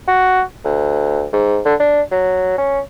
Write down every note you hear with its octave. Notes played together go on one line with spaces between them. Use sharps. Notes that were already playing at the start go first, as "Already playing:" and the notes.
F#4
D2
G#2
D3
D4
F#3
C#4